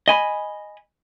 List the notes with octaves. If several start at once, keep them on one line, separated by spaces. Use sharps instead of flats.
D#5 G#5 B5